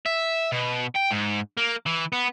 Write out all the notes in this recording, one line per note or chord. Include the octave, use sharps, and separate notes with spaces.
E5
B2
G5
G#2
A#3
E3
B3